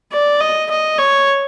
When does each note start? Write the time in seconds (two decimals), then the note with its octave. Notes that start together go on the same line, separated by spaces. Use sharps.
0.12 D5
0.41 D#5
0.70 D#5
0.98 C#5